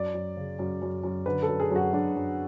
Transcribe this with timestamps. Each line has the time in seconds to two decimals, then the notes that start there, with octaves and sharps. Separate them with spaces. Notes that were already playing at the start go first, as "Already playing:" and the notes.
Already playing: F#2 D5
0.14 F#2
0.37 C#3
0.59 F#2
0.82 F#2
1.03 F#2
1.26 D3 B4
1.43 A4
1.48 F#2
1.60 G#4
1.71 F#2 F#4
1.93 F#2 D4
2.15 F#2